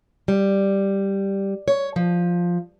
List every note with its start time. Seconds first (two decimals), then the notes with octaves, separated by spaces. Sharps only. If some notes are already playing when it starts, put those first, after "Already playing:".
0.28 G3
1.68 C#5
1.96 F3